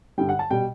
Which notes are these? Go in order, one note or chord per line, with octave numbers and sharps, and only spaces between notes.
G2 D3 G3 G5
F#5
A5
B2 G3 G5